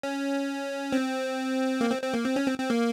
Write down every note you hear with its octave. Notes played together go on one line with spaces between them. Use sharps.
C#4
C4
A#3
C4
C4
A#3
C4
C#4
C4
C4
A#3